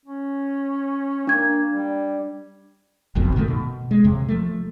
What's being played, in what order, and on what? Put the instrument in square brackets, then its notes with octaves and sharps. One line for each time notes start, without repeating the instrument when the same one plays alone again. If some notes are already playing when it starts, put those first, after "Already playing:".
[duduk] C#4
[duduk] A#3 [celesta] D4 G#6
[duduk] G3
[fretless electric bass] F#1 B1 F2 B2
A#2 D#3 G#3 A3
B2
G#3
D#2 C3
F3 A3